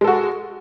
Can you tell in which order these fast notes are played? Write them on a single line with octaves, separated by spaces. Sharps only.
G#3 A4 F#4